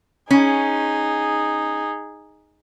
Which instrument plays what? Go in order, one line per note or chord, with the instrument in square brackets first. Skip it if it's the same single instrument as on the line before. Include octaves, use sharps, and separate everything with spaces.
[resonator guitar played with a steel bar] C#4 [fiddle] D#4 G#4